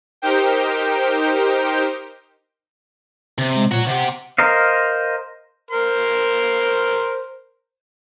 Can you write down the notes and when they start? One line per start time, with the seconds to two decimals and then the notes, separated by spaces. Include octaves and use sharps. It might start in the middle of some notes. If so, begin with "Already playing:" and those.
0.22 D#4 G4 A#4 C5 G5
3.38 C3
3.55 G#3
3.72 A#2 F#4 C#5
3.87 C3 G4 F#5
4.38 A#4 C5 D#5 F5
5.71 A#4 C5 C6